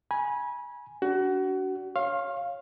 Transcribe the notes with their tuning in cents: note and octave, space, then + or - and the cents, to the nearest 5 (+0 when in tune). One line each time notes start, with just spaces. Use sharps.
G#5 +0 B5 -35
D4 -25 F#4 +25
C#5 +0 F5 +0 C6 +45